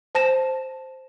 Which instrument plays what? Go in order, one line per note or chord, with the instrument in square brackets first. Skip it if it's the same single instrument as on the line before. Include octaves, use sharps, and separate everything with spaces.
[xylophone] C5 A5 A#6 E7